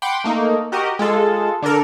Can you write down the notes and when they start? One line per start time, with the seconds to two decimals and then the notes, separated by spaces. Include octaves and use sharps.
0.02 F#5 G5 B5 C6 D6
0.24 A3 A#3 D#4
0.72 F#4 G4 A#4 D#5
0.99 G#3 F4 A4
1.62 D3 D4 A4 A#4